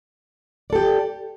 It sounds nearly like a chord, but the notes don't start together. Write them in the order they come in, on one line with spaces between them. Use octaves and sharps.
D5 A4 G4